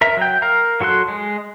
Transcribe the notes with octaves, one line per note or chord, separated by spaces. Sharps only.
A#4 E5 A#5
F#3 G5
A#4 F5 A#5
F#3 F#4 A4 C6 F#6
G#3